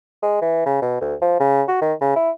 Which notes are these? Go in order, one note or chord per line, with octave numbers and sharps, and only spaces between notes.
G#3
E3
C#3
B2
D2
F3
C#3
F#4
D#3
C#3
E4